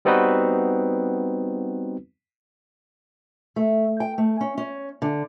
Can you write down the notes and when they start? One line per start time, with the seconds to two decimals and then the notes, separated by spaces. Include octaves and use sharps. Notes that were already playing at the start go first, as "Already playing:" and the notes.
0.05 G3 B3 C4 D#4 F#4 B4
3.56 A3
4.00 G5
4.18 A3
4.41 C#4
4.58 C#4
5.02 D3